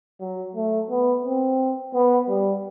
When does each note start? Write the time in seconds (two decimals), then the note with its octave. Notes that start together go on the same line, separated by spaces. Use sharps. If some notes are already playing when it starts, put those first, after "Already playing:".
0.20 F#3
0.56 A3
0.90 B3
1.25 C4
1.94 B3
2.29 G3